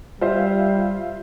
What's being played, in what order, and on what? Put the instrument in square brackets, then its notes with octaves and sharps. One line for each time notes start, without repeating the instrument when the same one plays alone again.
[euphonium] G3 [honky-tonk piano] F4 C5 E5